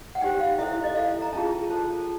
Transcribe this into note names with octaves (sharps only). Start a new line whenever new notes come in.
F#5
D#4 G4 C5 G5
F5
E4 A4 C5 E5
E5
D#5
E4 A4 C5 F5
A#5
C#4 F4 G#4 A5
F#4 A4 C5 A5